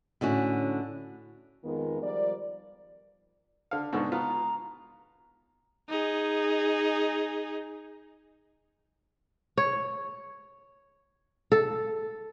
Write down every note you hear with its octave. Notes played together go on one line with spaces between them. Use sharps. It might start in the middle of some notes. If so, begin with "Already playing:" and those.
A2 D3 C#4 F#4
F2 D#3 G#3 B3 F4 A#4
F3 G3 A#4 D5
D3 F5
G#2 B2 D3 C#6
B3 F4 A#5
D#4 G#4
C#5
A4